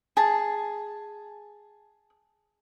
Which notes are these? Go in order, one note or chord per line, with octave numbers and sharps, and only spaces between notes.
G#4 A5